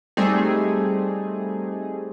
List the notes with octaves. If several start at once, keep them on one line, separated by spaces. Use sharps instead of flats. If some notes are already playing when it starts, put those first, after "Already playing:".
G3 A3 C4 D#4 G#4